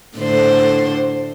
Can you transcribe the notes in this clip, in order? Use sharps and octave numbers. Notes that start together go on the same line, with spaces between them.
A2 D3 C5